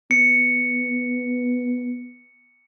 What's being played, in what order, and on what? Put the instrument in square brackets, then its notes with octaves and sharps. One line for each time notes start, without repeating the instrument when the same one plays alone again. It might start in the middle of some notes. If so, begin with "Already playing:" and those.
[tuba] B3 [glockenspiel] C#7